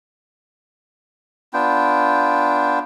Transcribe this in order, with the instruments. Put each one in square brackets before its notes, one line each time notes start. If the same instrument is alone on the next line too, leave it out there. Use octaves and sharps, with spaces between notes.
[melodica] B3 D4 F4 G5